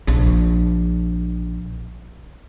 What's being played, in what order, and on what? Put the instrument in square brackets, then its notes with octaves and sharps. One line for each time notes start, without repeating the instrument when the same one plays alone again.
[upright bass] A#1 D4